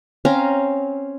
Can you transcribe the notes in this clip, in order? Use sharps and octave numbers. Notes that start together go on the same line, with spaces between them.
C4 C#4 F5 A#5